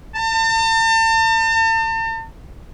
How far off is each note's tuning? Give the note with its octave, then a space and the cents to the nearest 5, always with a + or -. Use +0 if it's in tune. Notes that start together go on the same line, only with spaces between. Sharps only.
A5 +40